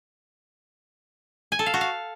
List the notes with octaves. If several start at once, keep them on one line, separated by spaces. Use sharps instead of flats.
G#5
A4
F5
F#4
F5